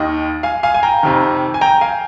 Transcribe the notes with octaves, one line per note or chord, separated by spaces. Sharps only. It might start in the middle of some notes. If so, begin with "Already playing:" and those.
Already playing: D#2 D#3 D#5
F5 G#5
F5 G#5
G#5
G5 A#5
F2 C3 D#3
G#5
G5 A#5
F5 G#5